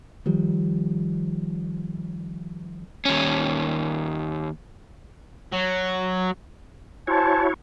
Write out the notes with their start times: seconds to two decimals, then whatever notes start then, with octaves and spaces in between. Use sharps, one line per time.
0.26 D#3 F3 G3
3.05 D#2 C#4
5.52 F#3
7.07 E4 F#4 C5 C#5 G#5 A5